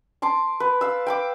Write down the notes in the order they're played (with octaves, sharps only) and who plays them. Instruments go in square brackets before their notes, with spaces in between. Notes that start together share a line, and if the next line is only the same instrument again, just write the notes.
[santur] A5 C6 D6
B4
F5 E6
G5 B5 D6